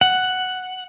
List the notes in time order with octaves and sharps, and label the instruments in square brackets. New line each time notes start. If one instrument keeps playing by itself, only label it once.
[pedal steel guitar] F#5